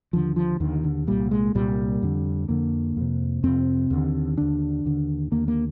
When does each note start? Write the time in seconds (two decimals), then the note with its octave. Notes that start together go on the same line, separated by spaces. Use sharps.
0.13 D#2 D3 F3
0.36 F3
0.60 D#2 D3 D#3
0.84 D3
1.08 C2 A#2 G3
1.31 G#3
1.55 C2 A#2 G3
2.02 F2 D3
2.49 F2 D3 A#3
2.97 F2 C3
3.44 F2 C3 C4
3.90 D#2 D3
4.37 D#2 D3 D4
4.85 D#2 D3
5.32 D#2 D3 A#3
5.48 A#3